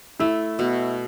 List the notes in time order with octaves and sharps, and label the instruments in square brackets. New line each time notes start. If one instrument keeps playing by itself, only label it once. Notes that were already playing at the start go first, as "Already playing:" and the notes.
[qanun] A3 [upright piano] E4
[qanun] B2